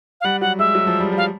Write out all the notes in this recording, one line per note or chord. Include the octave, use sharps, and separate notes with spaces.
F5
G3 F#5
F#3 F#5
G#3 E5
F#3
F3
G3
G3 F5